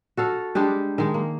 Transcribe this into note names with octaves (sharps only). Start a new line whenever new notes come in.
F#4 A4 F5
G3 G#3 D4 G4
D#3 G#3
A#3